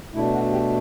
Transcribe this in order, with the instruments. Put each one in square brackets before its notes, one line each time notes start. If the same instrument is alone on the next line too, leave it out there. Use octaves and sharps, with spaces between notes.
[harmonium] B2 A3 D4 E4
F#4
G4